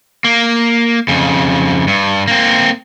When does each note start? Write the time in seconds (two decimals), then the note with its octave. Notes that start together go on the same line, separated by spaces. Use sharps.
0.24 A#3
1.08 F2 C#3
1.87 G2
2.28 A#3 C4